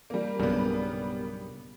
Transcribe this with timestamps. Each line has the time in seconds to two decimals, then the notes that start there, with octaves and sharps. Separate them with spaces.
0.10 G3 A#3
0.39 B1 G2 C#3 G3 A#3 B3